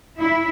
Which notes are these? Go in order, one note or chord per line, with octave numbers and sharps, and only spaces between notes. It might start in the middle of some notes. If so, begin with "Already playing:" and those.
E4